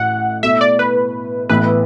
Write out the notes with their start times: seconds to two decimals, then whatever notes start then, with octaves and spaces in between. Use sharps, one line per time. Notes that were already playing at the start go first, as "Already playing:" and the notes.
Already playing: A1 A2 A3 F#4 F#5
0.43 B2 A3 E4 E5
0.61 D5
0.79 B4
1.49 A1 A2 E3 B3 B4